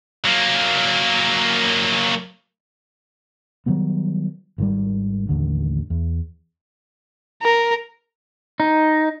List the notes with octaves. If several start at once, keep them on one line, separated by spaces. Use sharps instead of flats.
F#3 A#3
D#3 F#3 G3 B3
G#1 D#3 G3
A1 D#2 D3
E2
A#4
D#4